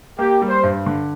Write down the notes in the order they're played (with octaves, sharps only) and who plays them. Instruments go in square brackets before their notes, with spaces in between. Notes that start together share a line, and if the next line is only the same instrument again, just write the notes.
[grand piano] A#3 [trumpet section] G4
[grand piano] G3
[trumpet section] C5
[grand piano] G2
D3